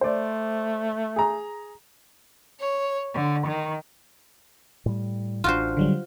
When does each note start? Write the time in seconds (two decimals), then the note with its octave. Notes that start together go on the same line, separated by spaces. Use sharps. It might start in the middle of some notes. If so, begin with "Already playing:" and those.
0.01 A3 C5 D5
1.16 G#4 A#5
2.61 C#5
3.14 D3
3.47 D#3
4.86 A2 G3
5.44 A1 D4 F4 F#4 C5
5.77 D3 F#3 G3